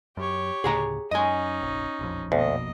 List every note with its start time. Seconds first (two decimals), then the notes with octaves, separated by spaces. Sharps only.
0.17 F#2 G4 C#5
0.64 D2 A2 C#3 G#4 F#5 A#5
1.11 F#2 C#4 D#4 D#5 G#5
1.62 F1 A#1
1.99 E1 A#1 F2
2.32 D2 B2 A#3 D#5